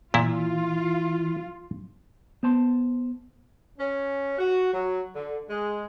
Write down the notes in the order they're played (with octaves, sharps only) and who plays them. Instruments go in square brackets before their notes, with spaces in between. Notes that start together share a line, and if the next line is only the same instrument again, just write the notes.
[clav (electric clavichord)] A#2 E4 [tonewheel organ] E3 [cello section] F4
[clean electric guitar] B3 C5 A5 C6
[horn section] C#4
F#4
F#3
D3
G#3